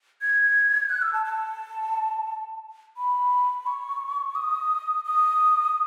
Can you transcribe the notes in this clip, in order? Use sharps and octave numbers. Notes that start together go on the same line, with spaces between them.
G#6
F#6
E6
A5
A5
B5
C#6
D#6
D#6